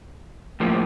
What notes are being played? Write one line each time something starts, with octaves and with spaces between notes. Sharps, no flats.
A2 F3 A#3